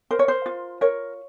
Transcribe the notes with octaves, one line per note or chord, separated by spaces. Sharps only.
A#4 C5
C#5
C5
F4
A#4 C#5